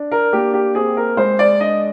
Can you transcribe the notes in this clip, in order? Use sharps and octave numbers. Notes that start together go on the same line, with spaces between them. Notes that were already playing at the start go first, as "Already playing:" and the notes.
Already playing: D4
A#4
A#3 G4
G4
C4 G#4
A#4
G#3 C5
D5
D4 D#5